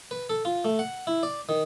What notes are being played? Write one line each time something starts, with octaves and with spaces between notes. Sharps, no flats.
B4
A4
F4
A3
F#5
E4
D5
D#3